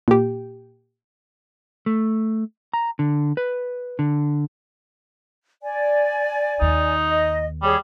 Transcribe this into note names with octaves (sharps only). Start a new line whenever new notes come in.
A#2 G4
A3
A#5
D3
B4
D3
D5 G#5
D#2 D#4
D#5
G3 G#4 C#5